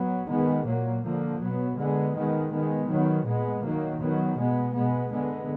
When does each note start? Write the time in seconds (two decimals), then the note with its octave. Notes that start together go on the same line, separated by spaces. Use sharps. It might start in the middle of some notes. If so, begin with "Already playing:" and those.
Already playing: F#3 B3
0.29 D#3 G#3 B3
0.66 A#2 F#3 A#3
1.03 D3 F3 A#3
1.40 B2 F#3 B3
1.77 D3 G#3 B3
2.15 D#3 G#3 B3
2.52 D#3 G#3 B3
2.89 D#3 F#3 B3
3.26 A#2 G#3 B3
3.63 D#3 F#3 A#3
4.00 D#3 F#3 B3
4.38 B2 G#3 B3
4.75 B2 G#3 B3
5.12 D3 G#3 B3